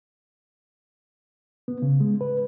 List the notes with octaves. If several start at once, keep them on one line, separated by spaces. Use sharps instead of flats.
B3
C#3
G#3
B4